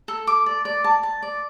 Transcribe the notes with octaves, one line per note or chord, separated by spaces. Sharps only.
A4
D6
D5
D5
A5
A5
D5